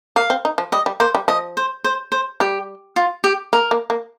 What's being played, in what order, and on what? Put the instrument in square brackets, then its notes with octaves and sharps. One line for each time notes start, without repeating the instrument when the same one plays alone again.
[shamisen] A#3 [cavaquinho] F5
[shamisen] C4
D#4
F3
[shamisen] G3 [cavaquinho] D#5
[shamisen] G3
[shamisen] A#3 [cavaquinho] C5
[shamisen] G3
[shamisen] F3 [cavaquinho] D#5
[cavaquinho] C5
C5
C5
[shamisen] G3 [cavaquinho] G4
[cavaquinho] F4
G4
[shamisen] A#3 [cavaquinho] A#4
[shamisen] A#3
A#3